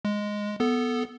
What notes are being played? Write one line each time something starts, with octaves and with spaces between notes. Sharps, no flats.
G#3
B3 A4